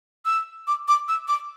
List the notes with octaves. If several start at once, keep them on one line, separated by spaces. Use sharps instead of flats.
E6
D6
D6
E6
D6